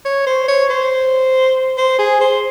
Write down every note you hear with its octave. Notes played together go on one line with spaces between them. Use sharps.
C#5
C5
C#5
C5
C5
G#4
C5